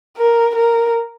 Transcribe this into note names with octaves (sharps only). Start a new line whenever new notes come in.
A#4
A#4